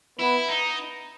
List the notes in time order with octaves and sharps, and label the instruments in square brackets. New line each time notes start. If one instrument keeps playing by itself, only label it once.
[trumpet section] B3 B4 [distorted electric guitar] E4
[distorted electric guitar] D#4